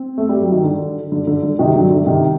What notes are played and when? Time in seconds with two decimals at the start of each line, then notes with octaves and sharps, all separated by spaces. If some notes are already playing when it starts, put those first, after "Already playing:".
Already playing: C4
0.18 A3
0.29 G3
0.41 F#3
0.52 D#3
0.64 D3
1.12 D3
1.27 D3
1.43 D3
1.59 C3 D#3
1.75 D3 F#3
1.91 D3
2.06 C3 D#3